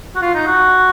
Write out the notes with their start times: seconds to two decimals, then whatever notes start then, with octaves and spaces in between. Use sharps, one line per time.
0.15 F#4
0.22 F4
0.34 D#4
0.46 F#4